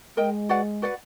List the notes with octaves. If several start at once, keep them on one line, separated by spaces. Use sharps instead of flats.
G#3 A#4 D#5 G5
F#4 B4 D5 F#5
F#4 B4 D5 F#5